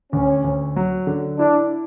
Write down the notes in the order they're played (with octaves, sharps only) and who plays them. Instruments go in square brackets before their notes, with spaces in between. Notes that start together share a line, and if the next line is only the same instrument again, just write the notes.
[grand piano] D2 [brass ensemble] C#4
[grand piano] D2
F#3
D3
[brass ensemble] D4 [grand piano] E4